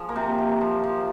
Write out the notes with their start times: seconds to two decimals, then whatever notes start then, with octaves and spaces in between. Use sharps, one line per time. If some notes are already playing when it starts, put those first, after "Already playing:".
Already playing: F3 G#4
0.09 A#3
0.16 C3
0.38 C3
0.61 F3
0.84 F3